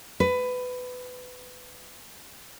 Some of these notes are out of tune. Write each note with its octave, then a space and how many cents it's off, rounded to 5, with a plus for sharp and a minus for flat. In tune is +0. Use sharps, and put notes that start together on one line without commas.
B4 +20